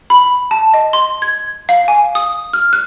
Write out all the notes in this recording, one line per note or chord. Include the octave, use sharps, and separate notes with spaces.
B5
A5
D#5
C6
G#6
F5
G#5
D#6
F6
F#6